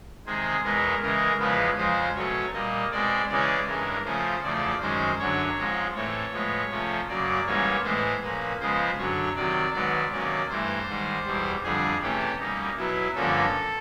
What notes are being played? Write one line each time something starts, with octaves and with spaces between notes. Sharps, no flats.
C3 D#3 G#3 C4 G#4
E2 B2 G#3 B3 A#4
C#3 E3 G#3 A#4
E2 C#3 F3 G#3 B3 B4
F2 C#3 F3 G#3 C5
B2 F#3 A3 C#4 C#5
A#2 G3 A#3 D#5
B2 G#3 C4 D5
C#3 E3 G#3 C#4 D5
G2 E3 G#3 C#4 A#4
C#3 F3 A3 C#4 C5
E2 C#3 F3 A3 D5
F#2 D#3 G#3 C#4 C5
F#2 D3 F#3 C#5
G#2 F3 G#3 C4
A2 E3 A3 C4 C#5
A2 F3 G#3 B3
C3 F3 A3 C#4
F#2 C#3 F#3 A#3 D5
G#2 E3 G3 A#3 C#4 C#5
A2 E3 G#3 B3 C5
A#2 F3 A#3 C#4 B4
C#3 F3 G#3 B3 C5
F#2 D3 F#3 C#5
C3 D#3 F#3 D5
G#2 D#3 F#3 B3 D5
C3 D#3 F#3 A#3 C#4 D5
G2 E3 A3 C5
G#2 D#3 G3
E2 B2 G3
F2 D3 G3 G#4
C3 E3 A3 C#4 G4
B2 G3 A#3 C#4 D#4
B2 F#3 B3 E4
G2 D3 F3 A#3 C#4 A4